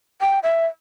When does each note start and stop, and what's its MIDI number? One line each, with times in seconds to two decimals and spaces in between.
0.21 0.39 79
0.43 0.66 76